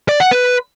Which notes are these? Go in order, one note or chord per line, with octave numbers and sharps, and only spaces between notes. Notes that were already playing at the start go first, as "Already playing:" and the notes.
D5
F#5
B4